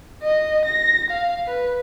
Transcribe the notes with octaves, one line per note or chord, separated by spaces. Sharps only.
D#5
A#6
F5
B4